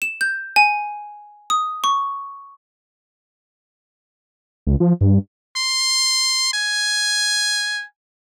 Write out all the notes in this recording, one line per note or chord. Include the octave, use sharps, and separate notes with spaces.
E7
G6
G#5
D#6
C#6
C#2
F3
G2
C6
G#5